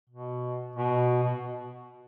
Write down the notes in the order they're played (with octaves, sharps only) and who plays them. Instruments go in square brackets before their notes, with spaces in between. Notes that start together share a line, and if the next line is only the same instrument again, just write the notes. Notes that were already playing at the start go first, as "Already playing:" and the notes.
[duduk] B2
B2
B2